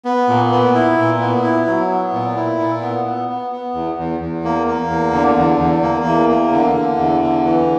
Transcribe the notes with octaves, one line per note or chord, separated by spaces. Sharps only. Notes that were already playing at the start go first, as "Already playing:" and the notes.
B3
A#2
B3
E4
A#2
B3
E4
F#3
B3
A#2
E4
A#2
B3
B3
B3
B3
E2
E2
E2
A#3
A#3
E2
D3
E2
E2
A#3
E2
A#3
D3
D3
E2
D3
E3